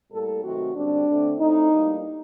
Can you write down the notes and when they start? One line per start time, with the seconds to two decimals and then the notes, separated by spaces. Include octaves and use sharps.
0.11 A2 G3 A#3 A4
0.43 C3 D#3 F#3 A3 C4 F#4
0.75 D3 G3 C4 D4
1.07 D3 A3 C4
1.39 A2 A3 C4 D#4
1.71 A2 G3 A#3